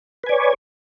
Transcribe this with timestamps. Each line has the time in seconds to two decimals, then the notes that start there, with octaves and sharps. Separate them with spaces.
0.24 B4
0.26 G#5
0.29 D5
0.32 C#5